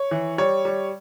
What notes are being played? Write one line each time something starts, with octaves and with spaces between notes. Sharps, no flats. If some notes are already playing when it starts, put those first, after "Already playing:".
Already playing: C#5
E3
G3 C#5
G3